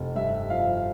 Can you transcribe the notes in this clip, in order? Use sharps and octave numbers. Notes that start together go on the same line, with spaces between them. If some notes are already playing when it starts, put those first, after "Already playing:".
Already playing: F1
G2 E5
F3 F5